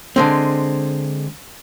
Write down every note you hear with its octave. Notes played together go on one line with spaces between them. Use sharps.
D3 G#3 C4